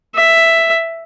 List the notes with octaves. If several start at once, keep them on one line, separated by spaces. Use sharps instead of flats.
E5